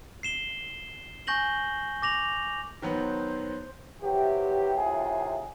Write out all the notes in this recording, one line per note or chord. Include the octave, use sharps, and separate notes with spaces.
C7 E7 G7
G#5 C#6 G6 A#6 F#7 G7
D6 A#6 F7 F#7
D#3 F#3 B3 C5
C3 E3 F#3 G4
A2 C3 D#3 F4 G#4